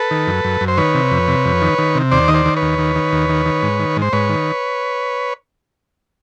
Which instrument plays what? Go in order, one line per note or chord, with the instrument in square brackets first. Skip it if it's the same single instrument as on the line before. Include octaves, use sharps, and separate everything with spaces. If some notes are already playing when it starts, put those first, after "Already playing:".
Already playing: [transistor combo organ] A4 B4
D#3
F#2
F#2
F#2
C5
D#3 B4 C#5
C3
F2
C3
F2
D#3
D#3
C3
D#2 C5 D5
D#3 D#5
C5 D5
D#3
B4 C#5
D#2
D#3
D#3
D#2
D#3
D#3
G#2
D#3
G#2
C5
G#2 B4 C#5
D#3